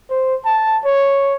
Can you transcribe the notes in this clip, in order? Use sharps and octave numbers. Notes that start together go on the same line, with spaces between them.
C5
A5
C#5